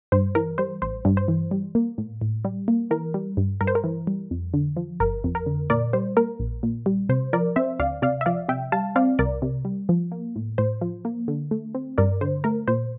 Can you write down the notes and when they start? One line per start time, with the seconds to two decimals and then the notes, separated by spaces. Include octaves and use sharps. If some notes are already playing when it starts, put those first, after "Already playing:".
0.12 G2 C5
0.35 E3 A#4
0.58 G3 C5
0.82 A1 C5
1.05 G2
1.17 C5
1.28 E3
1.51 G3
1.75 A#3
1.98 A2
2.22 A2
2.45 G3
2.68 A#3
2.91 E3 A#4
3.14 G3
3.37 G2
3.61 G2 A#4
3.67 C5
3.75 A#4
3.84 E3
4.07 G3
4.31 F2
4.54 D3
4.77 F3
5.00 G1 A#4
5.24 F2
5.35 A#4
5.46 D3
5.70 A#2 A#4 D5
5.93 G3 C5
6.17 A#3 A#4
6.40 A#1
6.63 A#2
6.86 G3
7.09 C3 C5
7.33 F3 A#4 D5
7.56 C4 C5 E5
7.79 D2 D5 F5
8.02 C3 D5 F5
8.21 E5
8.26 F3 D5 F5
8.49 C3 E5 G5
8.72 G3 F5 A5
8.96 C4 D5 F5
9.19 C2 A#4 D5
9.42 C3
9.65 G3
9.89 F3
10.12 A#3
10.36 A2
10.58 A2 C5
10.81 F3
11.05 A#3
11.28 D3
11.51 A3
11.75 C4
11.98 G2 A#4 D5
12.21 D3 C5
12.44 A3 A#4
12.68 A#2 C5